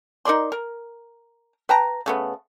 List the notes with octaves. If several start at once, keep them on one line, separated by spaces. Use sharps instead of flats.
D#4 A#4 D5 C6
A#4
B4 G5 A5 A#5
C#3 A3 B3